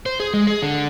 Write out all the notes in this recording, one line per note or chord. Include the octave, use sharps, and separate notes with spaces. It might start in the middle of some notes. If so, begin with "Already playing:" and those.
C5
G#4
G#3
G#4
D3